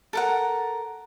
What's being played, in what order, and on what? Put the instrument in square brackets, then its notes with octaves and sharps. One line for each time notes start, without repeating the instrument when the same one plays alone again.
[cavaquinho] A4 A#4 F#5